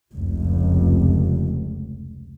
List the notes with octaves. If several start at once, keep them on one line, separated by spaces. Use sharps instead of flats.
F1 C#2